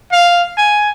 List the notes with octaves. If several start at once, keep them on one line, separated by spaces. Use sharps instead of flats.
F5
G#5